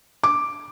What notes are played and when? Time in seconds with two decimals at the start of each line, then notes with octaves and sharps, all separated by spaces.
0.23 D6